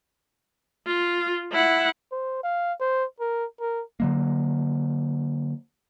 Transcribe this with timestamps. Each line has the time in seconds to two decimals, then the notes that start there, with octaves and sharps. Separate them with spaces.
0.86 F4
1.52 E4 F#5
2.12 C5
2.43 F5
2.80 C5
3.20 A#4
3.60 A#4
4.00 D3 F#3 A#3